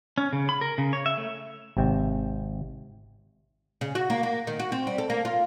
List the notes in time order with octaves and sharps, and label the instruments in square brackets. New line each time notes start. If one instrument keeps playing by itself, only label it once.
[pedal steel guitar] C#4
C#3
B5
A#4
C#3
C#5
E5
A3
[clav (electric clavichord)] G#1 C3 G5
[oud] C#3
F#4
A#3
A#3
D#3
F#4
C4
G3
A4
A#3
F4